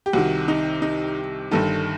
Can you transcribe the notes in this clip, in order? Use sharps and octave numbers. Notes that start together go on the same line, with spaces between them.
G4
C2 C3 D#3 F#4
D#4
D#4
G1 G2 D#3 A4